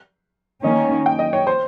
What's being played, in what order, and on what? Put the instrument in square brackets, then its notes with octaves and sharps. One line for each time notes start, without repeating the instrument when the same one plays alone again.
[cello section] D#3 A#3 C#4 [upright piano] D#5
[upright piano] G5
D#5
C#5
C5